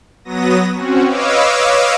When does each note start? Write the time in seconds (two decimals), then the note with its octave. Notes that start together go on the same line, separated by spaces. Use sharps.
0.25 F#3 B3 D#6 A#6
0.74 C4 C#4 F#4
1.06 B4 C#5 D#5 F5 D6 E6